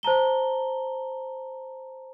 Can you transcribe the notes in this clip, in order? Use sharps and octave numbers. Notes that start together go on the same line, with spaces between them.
C5 A5 A#5 G7